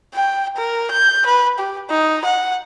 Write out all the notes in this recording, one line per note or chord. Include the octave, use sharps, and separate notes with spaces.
G5
A#4
G6
B4
G4
D#4
F#5